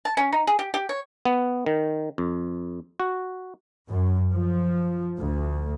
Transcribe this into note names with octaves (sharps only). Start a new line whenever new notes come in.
A5
C#4
D#4
G#4
G4
G4
C#5
B3
D#3
F2
F#4
F#2
F3
D2